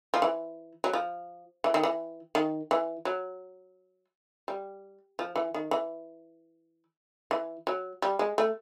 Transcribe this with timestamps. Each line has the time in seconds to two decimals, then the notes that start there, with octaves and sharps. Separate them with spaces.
0.14 F3
0.22 E3
0.84 F#3
0.93 F3
1.64 E3
1.74 D#3
1.83 E3
2.35 D#3
2.71 E3
3.05 F#3
4.48 G3
5.19 F3
5.36 E3
5.54 D#3
5.71 E3
7.31 E3
7.67 F#3
8.02 G3
8.19 G#3
8.38 A3